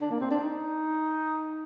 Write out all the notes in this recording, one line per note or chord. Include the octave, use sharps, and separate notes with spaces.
D4
A#3
C4
D4
D#4